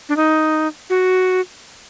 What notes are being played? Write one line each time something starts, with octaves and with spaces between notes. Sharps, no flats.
D4
D#4
F#4